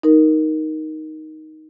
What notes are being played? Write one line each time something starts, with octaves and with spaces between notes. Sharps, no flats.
D#4 A#4